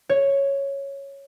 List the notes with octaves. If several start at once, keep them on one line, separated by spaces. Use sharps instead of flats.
C#5